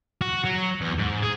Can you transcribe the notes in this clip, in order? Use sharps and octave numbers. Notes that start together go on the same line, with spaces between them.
F#4
F#3
E2
G#2
G#4